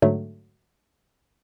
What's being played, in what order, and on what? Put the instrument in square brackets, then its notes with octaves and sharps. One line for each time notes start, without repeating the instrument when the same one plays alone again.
[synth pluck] G#2 D3 F#3 A3